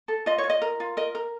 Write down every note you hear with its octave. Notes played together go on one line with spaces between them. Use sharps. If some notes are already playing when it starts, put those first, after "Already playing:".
A4
F4 D#5
C#5
F4
D#5
A#4
F4
A#4 D#5
A#4